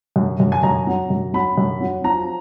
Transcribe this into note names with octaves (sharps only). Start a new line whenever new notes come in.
F#2
F#2
G#5
F#2 A#5
F#3
F#2
F#3 B5
F#2
F#3
F3 A#5